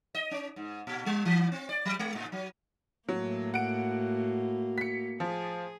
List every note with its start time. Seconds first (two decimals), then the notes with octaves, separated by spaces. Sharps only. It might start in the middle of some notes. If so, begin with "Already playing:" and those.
0.15 D#5
0.31 C#4
0.56 G#2
0.87 A#2
1.06 G3
1.25 E3
1.52 C4
1.69 D5
1.85 F#3
1.99 G#3
2.15 A2
2.32 F#3
3.09 A2 F#3 A#3
3.54 F#4 F#5 D7
4.78 B6 C#7
5.20 F3 G#4